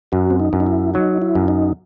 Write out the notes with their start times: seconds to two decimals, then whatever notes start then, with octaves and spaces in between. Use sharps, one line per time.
0.12 F#2 F#4
0.30 C4
0.40 D#4
0.53 F#2
0.60 D#4
0.66 E4
0.94 F#3 D#4
1.22 E4
1.35 F#2
1.48 D#4